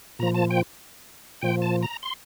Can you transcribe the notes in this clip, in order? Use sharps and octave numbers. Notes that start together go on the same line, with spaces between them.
A#2 F3 A#5
A5
G5
A#2 F3 G5
A5
A#5
C6